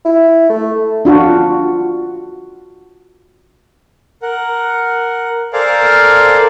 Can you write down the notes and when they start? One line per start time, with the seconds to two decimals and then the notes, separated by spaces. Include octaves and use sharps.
0.05 E4
0.50 A3
1.05 D4 F4 F#4
4.22 A#4 F#5
5.53 A4 A#4 C5 D5 F5 G#5